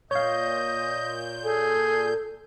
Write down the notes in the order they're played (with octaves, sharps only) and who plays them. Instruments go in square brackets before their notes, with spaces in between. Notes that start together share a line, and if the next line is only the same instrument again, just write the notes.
[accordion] A#2 G6 [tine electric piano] C#5 F5 [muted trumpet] D#5
[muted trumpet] G#4 [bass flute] A4